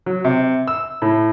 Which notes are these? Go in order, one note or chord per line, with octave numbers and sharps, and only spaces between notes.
F#3
C3
E6
A2